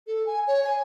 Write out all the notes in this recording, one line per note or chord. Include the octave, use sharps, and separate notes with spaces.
A4
G#5
C#5
G#5